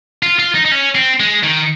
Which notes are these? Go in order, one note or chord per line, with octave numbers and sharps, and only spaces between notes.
F4
F4
D#4
D#4
C#4
C4
G#3
D#3